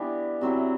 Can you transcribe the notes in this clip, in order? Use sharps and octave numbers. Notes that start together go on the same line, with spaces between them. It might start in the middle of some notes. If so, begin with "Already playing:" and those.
Already playing: E3 B3 D4 G4
C3 F#3 C4 E4